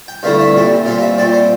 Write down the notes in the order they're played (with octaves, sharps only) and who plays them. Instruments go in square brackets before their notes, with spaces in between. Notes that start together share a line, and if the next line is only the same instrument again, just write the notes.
[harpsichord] G5
G2 D3 A3 C4 E4 F5
E5
A#2 G3 C4
A#2 G3 C4 F5
E5
A#2 G3 C4 D5
C5